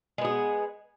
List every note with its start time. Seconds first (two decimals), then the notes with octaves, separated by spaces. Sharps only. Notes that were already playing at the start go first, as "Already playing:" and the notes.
0.18 G#3
0.21 B3
0.25 G#4